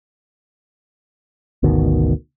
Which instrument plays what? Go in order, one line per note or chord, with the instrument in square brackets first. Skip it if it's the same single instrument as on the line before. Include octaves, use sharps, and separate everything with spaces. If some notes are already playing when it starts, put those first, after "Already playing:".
[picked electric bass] G#1 D2 B2 D#3